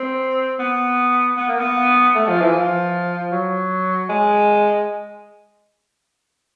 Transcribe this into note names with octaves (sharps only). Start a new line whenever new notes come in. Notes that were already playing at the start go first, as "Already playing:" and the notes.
Already playing: C4
B3
B3
A#3
B3
A3
F3
E3
F3
F#3
G#3